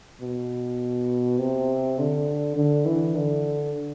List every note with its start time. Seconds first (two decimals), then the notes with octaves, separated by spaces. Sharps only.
0.21 B2
1.39 C3
1.98 D3
2.56 D3
2.86 E3
3.15 D3